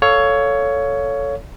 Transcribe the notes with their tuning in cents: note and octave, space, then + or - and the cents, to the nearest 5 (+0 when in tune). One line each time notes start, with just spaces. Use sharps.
A4 +5 C#5 +15 F5 +10